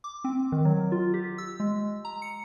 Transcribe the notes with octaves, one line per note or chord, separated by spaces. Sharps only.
D6
C4
D#3
F#3
F4
G4
E6
G#3
A#5
C#7